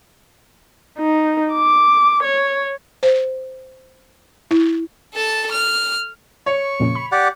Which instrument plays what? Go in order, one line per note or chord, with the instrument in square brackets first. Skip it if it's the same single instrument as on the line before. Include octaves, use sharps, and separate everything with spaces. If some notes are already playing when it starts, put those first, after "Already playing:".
[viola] D#4
D6
C#5
[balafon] C5
E4
[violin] A4 A5
F6
[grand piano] C#5 [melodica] C#6
[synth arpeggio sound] F2 A#2 C#3
B5
[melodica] G4 D5 F#5